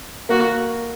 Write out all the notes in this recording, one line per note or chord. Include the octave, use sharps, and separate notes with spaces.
A#3 F#4